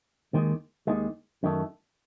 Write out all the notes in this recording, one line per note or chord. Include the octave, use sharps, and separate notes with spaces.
D#2 D#3 G#3
D#2 D#3 G#3
F#2 D#3 A3